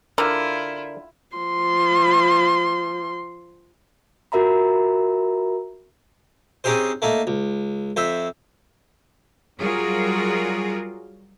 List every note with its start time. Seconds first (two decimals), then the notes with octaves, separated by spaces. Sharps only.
0.18 D3 E4 F4 A#4
1.36 F3 C6
4.32 F4 F#4 A#4 E5 A#5 B5
6.64 C4 C#4 D#4 G4 G#4 C5
7.02 A3 A#3 D#4
7.27 C#2
7.97 F2 C5 E5
9.59 F#3 G3 F4 F#4 G#4 A#4